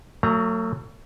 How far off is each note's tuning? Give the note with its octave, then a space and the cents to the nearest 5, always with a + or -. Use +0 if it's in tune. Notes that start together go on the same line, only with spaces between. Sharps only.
F#3 +0 A3 +40 A#5 +0